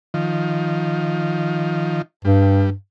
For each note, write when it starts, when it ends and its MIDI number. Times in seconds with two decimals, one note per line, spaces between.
0.14 2.02 51
0.14 2.02 53
2.25 2.73 43
2.25 2.70 55